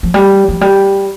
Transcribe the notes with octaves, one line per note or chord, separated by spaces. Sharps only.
F3
G3
F3
G3